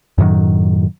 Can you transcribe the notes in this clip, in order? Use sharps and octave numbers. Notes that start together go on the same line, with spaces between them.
F#2 A2 D#3 F#3